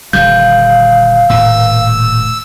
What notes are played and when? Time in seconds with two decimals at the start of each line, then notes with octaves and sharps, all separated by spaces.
0.13 D#1 D3 G3 F5 G6
1.30 D#1 A2 E6